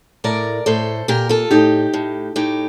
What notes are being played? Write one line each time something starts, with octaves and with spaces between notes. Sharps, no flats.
A2 A#4 D5
A2 A4 C5
A#2 G4 A#4
F4 A4
A2 D#4 G4
A2
A2 D#4 G4